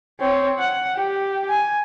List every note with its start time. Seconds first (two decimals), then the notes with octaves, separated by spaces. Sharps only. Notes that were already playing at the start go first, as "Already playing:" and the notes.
0.19 C4 C#5
0.58 F#5
0.95 G4
1.49 G#5